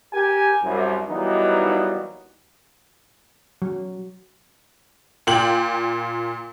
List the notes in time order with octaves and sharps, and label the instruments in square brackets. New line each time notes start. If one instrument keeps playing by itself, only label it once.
[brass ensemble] G4 A#4 G#5
C2 F#2
E3 F#3 G3 A#3 B3 D#4
[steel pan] F#3
[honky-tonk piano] A#2 G5 F#7